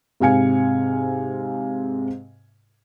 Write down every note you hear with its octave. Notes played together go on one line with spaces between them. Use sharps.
G#2 C3 F5 G#5 C#7